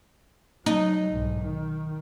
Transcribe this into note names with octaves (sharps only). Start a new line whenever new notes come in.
F#3 D#4
B1 G#2
D#3